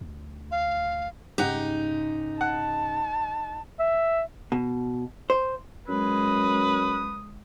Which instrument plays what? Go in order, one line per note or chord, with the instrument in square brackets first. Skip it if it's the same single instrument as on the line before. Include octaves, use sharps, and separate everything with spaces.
[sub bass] D2
[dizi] F5
[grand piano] G#2 C#3 [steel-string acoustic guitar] D#4 [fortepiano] G4 F#5
[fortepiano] F#5 [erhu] A5
[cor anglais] E5
[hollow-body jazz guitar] B2
C5
[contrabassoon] F#2 [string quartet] G#3 [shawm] B4 [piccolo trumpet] D#6